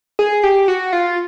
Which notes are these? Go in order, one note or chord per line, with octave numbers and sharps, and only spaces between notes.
G#4
G4
F#4
F4